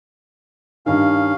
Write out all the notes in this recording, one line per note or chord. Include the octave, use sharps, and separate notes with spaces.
G2 D#3 C#4 F5